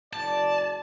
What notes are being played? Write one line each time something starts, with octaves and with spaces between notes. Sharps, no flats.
F#1 D5 A5